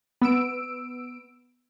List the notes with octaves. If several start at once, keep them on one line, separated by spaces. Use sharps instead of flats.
B3 E6 D7